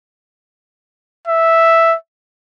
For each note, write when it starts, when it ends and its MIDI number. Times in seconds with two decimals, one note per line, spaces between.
1.28 1.96 76